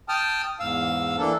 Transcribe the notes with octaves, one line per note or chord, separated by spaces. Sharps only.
G5 A5 D#6 F6
E2 G#2 F5 E6
E3 A#3 D4 A4